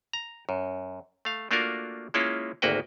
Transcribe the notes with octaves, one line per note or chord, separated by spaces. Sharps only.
A#5
F#2
A3 F5
A3 A#3 D4 F4 F#4 A#4
G#3 A#3 C#4 E4 F4
G#1 D2 A#3 F#4 B4 G5